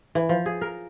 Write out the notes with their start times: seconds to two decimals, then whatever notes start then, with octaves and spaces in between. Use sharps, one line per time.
0.15 E3
0.29 F3
0.46 G#4
0.61 A#4